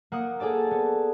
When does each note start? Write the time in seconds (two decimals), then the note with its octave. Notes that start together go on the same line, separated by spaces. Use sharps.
0.12 A#3 F#5 D#6
0.40 G#4 A4 D5 A5
0.71 B3